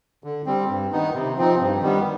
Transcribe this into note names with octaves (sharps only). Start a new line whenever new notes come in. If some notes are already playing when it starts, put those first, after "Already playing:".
D3
G3 C4
G2
D#3 B3 D#4
C3
F3 C4 D#4
G2
D#3 G3 B3